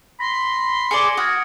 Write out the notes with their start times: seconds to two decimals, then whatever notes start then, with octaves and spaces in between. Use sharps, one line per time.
0.20 B5 C6 A#6
0.91 G#4 C5 D5 C#7 D7
1.17 F#4 D#6 F6 G#6